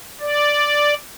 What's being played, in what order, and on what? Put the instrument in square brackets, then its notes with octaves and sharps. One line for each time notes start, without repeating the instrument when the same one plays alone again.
[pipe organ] D5